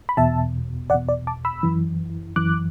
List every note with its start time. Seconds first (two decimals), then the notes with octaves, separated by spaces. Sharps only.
0.09 B5
0.17 E2 B2 E5 A5
0.90 E2 D5 F#5
0.94 B2
1.09 D5
1.27 A5 D6
1.45 B5 E6
1.63 F#2 E3
2.36 F#2 E3 D6 F#6